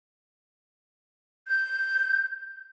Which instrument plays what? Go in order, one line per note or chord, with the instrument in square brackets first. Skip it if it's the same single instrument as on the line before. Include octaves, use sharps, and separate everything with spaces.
[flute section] G6